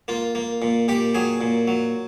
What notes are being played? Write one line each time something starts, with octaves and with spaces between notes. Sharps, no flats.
A#3 F4
A#3
A#2
A#2 G4
F#3 G#4
A#2
F#3